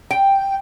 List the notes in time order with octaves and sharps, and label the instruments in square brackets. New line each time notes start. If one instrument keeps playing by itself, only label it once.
[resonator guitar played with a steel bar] G5